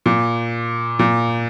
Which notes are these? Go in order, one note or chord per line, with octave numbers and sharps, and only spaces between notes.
A#2
A#2